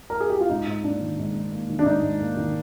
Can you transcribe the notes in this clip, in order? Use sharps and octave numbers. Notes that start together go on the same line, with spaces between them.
A#4
G#4
G4
F4
G#2 D#4
G#2
A#3 D4
D#3
G#2
G#2
A#3
D#3
D4
G#2 D#4
G#2
A#3
D#3